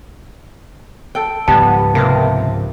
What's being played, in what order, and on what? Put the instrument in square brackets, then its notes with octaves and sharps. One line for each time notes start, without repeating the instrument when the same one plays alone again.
[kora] A4 G5
[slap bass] C#2 G#2 F3 [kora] G3 [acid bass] B3 [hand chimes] A5
[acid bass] C3 [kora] A#3 B3 F4